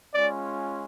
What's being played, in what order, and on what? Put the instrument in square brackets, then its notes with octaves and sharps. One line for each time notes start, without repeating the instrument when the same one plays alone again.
[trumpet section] G#3 C#4 F4 D5